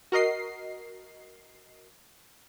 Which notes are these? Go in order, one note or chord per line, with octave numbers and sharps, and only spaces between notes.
F#4 A#4 D#5 C7